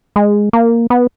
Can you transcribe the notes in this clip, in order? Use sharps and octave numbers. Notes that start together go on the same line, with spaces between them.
G#3
A#3
B3